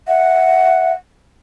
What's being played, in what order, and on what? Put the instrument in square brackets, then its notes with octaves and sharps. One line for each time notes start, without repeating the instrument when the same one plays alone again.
[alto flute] E5 [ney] F#5